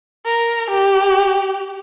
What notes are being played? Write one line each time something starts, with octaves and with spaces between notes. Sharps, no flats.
A#4
G4